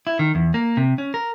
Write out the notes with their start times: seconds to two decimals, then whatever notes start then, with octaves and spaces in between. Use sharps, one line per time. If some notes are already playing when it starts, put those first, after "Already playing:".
0.07 E4
0.19 D#3
0.35 E2
0.54 A#3
0.77 C3
0.98 C#4
1.14 A#4